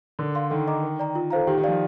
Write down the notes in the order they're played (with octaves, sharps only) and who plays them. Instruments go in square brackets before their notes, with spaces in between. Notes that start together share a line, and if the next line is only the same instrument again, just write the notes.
[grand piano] D3 [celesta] A#4
[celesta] D5 F5 C6
[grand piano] D#3 [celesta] A4
[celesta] D#5 A#5 D6
A#4
D5 G5 A#5
F4
A4 C5 F5 A#5
[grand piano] D#3 [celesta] G4
[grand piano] D#3
[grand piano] F3 [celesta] D5 F5